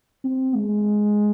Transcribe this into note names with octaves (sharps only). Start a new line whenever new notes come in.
C4
G#3